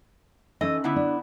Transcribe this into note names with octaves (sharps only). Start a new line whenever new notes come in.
E3 C#4 D#4 A4 D#5
D3 B3 E4
D4